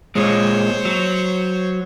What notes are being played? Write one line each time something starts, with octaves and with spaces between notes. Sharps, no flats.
A#2 G#3 C5 C#5
F#3